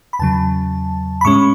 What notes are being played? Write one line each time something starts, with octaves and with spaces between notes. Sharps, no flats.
B5
E2 C#3 F#3 A5
B5
A2 G#3 C#4 C#6